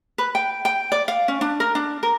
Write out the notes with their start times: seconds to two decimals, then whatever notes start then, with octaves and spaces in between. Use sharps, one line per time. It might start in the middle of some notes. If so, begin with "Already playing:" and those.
0.18 B4
0.35 G5
0.65 G5
0.92 D5
1.08 F5
1.28 C#4
1.41 D4
1.60 A#4
1.75 D4
2.03 A#4